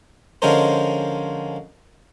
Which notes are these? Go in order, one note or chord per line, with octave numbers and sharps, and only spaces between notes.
D3 F3 G#3 C#4 A#4 C5